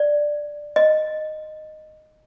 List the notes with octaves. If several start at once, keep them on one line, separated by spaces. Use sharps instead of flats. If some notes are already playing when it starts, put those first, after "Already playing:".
Already playing: D5
D#5